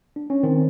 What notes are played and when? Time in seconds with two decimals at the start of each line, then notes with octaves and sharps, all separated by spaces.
0.16 D4
0.30 C#4
0.43 D#3 C4